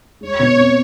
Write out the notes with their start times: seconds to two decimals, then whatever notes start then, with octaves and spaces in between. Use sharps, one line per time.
0.21 G#3 C#5
0.39 B2
0.57 C4